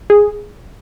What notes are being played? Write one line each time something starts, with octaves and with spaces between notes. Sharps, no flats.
G#4